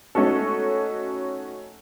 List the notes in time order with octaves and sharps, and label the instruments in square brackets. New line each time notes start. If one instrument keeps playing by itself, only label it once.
[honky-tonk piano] A3 C#4 D#4 F#4 A4